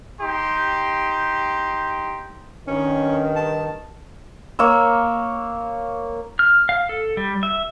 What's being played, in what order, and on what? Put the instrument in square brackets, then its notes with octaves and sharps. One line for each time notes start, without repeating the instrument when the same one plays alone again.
[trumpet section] D#4 G4 C6
[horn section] G2 D#3 [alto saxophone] C#4
[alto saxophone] A5
[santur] A#3 C#5 E6
[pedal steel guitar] F6
F5
A4
G3
E5